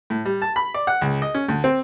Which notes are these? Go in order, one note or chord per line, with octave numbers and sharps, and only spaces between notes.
A2
G3
A5
B5
D5
F#5
C#2
D#5
C#4
D2
C4